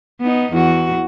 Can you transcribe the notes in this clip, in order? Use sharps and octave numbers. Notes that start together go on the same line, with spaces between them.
B3 D#4
E2 F#4